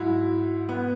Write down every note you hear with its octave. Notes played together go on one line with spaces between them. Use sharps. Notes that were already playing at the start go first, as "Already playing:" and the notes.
Already playing: G#2 F#3 E4
B3